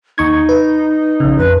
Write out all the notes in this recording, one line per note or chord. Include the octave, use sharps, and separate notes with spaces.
D#2 D#4 C#6 G#6
B4
A#1 C#3
F2 B4